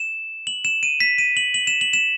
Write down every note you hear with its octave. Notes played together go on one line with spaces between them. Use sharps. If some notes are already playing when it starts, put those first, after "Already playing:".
Already playing: E7
F#7
E7
D#7
B6
D#7
F#7
F#7
E7
F#7
E7